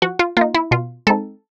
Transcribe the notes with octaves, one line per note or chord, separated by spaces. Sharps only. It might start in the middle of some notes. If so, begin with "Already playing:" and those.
F3 F#4
F4
A#3 D#4 F4
E4
B2 F4
G#3 C4 D#4 A4